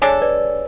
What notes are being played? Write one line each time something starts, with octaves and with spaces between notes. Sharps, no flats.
G#3 D4 A4 C#5
B4 D5